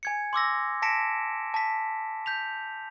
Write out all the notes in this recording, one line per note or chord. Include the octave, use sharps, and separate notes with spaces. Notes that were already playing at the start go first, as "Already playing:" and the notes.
G#5 G#6 C#7
C6 D6 E6 A#6
A5 A#6 B6 C#7 D7 E7
A5 B6
G6 B6 F7